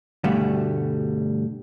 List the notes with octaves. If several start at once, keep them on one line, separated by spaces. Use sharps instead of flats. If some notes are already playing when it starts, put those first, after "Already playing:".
D2 G2 B2 D3 G3 A3